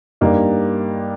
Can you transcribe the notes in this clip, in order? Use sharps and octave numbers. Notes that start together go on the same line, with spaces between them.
G2 G3 A#3 D#4